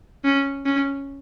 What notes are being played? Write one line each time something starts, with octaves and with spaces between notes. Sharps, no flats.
C#4
C#4